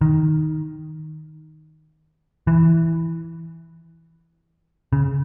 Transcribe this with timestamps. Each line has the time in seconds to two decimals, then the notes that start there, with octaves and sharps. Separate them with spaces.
0.01 D#3
2.47 E3
4.93 C#3